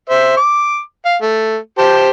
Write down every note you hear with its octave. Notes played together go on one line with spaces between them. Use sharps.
C5 E5
D6
F5
A3
G4 C5 A5